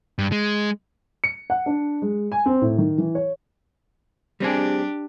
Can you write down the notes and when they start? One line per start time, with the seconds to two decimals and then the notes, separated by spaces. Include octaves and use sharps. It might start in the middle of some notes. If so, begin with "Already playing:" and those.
0.19 G2
0.32 G#3
1.24 C#7
1.50 F#5
1.66 D4
2.02 G#3
2.32 G#5
2.46 C4
2.62 A2
2.78 D#3
2.98 E3
3.15 C#5
4.40 G3 C4 D4 G4 G#4